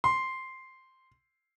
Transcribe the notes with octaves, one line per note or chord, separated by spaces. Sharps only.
C6